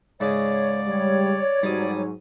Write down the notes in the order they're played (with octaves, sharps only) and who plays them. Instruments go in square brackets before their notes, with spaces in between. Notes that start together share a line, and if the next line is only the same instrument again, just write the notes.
[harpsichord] G#2 C#3 G#3 [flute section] C#5 [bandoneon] D5
[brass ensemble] G3 [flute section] C#5
[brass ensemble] G#2 F#3 [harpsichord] G3 D#6